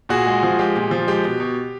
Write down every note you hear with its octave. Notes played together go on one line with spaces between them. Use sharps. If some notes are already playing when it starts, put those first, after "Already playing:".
A#2 F#4 G#4
G#3
F3
G#3 G4
A#2
F3
G#3 G4
B2
B2